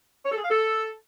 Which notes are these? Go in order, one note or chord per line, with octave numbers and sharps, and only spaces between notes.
C#5
A4
G#4
F5
A4